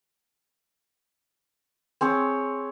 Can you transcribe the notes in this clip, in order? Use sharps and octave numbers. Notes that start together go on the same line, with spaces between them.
C4 G#4 C#5